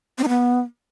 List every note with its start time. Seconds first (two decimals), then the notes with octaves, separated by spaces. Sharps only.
0.18 C4
0.23 D#4
0.28 B3